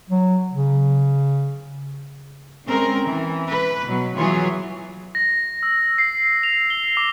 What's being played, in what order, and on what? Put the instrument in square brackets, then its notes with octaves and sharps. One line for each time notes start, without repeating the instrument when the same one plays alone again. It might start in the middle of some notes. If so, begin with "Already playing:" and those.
[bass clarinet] F#3
C#3
[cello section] G#3 C4 C#4 A#4
E3
B4
B2 F#3
E3 F#3 F4 G#4 C#5
[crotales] A#6
E6
C7
F7
G7
D6